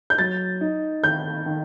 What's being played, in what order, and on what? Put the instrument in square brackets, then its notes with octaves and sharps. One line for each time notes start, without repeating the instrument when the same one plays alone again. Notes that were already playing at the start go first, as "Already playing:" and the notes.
[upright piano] G6
[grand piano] F#3 [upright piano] A6
[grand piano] D#4
[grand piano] D#3 [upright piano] G6
[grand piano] D#3